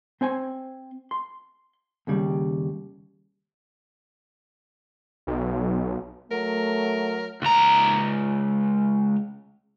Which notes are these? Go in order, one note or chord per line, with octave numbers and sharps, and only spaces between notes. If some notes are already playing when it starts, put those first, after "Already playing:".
C4 C5 G#5
C6
D#2 C#3 G3
B1
F#3 A3 A#4
C#2 A#5